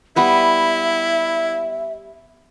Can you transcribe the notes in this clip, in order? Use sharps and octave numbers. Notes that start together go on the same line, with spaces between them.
G3 B3 E4 B4 E5